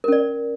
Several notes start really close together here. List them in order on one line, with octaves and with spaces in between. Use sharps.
A#4 C#4 D5